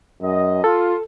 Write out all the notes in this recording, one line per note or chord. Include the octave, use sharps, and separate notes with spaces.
F#2 D#5
F4 A4